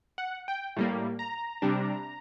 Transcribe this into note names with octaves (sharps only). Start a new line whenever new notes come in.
F#5
G5
A2 G3 A#3
A#5
C3 G3 D4